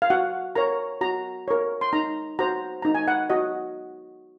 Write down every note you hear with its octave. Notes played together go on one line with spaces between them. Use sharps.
F5
F#4 F#5
A#4 C#5 A#5
F#4 A#5
A#4 C#5
C6
D#4 A#5
F#4 C5 A#5
D#4 A#5
G#5
F#5
F#4 D#5